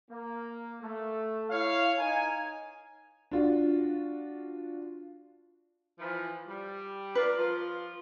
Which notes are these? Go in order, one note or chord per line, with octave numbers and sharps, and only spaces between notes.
A#3
A3
E4 C#5 F5
D#4 A#4 G#5
D4 F4 F#4
E3 F3
G3
F4 A#4 B4 D5
F3 F4